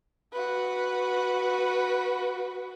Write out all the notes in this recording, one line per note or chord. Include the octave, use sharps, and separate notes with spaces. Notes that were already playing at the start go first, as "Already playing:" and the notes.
F#4 B4